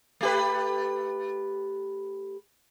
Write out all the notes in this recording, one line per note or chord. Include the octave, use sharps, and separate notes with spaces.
A3 G4 B4